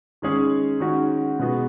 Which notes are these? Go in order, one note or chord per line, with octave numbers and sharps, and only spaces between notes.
D#3 G#3 C#4 G#4
D#3 G#3 C#4 F#4
B2 G#3 B3 F#4